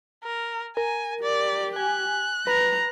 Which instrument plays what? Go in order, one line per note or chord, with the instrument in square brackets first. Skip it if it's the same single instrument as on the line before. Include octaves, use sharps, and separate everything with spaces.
[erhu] A#4
[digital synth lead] A#4 [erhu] G#5
[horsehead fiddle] G4 [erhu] D5
[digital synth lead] G#5 [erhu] F#6
[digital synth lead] B4 [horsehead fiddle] A#5